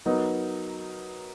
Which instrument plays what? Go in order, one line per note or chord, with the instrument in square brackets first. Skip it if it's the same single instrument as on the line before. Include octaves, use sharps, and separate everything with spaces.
[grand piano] F#3 B3 D#4 A#4